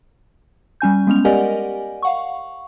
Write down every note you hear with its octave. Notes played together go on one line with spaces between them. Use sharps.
G3 C#4 G#5 G6
G#3 B3 C#4 F7
G4 A#4 D5 D#5 F#5 G#5
F5 F#5 C#6